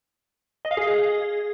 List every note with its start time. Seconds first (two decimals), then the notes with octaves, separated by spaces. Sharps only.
0.65 D#5
0.71 F5
0.77 G#4